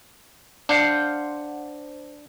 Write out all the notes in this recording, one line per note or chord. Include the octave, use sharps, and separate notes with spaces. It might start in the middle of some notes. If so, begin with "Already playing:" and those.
D4 C5 F5 F#5